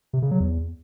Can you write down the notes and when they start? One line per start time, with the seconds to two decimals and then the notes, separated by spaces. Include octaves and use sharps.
0.13 C3
0.22 C#3
0.31 F#3
0.40 E2